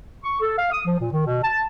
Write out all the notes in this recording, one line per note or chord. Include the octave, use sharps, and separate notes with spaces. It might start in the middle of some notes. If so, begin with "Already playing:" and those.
C#6
A4
F5
D#6
F3
A#2
D#3
B2
A5